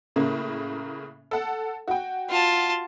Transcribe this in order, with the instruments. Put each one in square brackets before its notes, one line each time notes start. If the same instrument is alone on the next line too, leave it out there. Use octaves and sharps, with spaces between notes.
[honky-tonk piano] A2 C#3 A#3
A4 F#5
F#4 G5
[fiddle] F4 A5